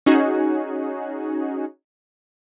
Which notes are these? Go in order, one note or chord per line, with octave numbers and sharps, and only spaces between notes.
C#4 D#4 F#4 G#4